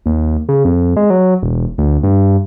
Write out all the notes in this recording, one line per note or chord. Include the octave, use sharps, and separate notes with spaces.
D#2
C#3
F2
G#3
F#3
E1
D2
G2